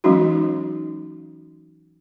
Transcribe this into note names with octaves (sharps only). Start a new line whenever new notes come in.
E3 F#3 G#3 C#4 D#4 F#4